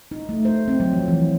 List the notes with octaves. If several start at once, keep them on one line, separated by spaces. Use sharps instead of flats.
D#4
A3
C5
C4
F#3
F3
E3